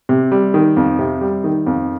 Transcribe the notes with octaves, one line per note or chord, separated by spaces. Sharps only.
C3
G3
D#3
F2
C3
G3
D#3
F2